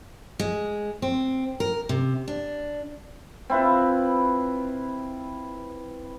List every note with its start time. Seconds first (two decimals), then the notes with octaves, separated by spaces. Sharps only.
0.39 G#3
1.02 C4
1.60 A#4
1.89 C3
2.28 D4
3.50 C4 E4 F4 B4